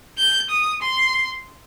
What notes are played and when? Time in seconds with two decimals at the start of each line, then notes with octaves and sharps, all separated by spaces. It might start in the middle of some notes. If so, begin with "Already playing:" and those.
0.18 G6
0.50 D#6
0.82 C6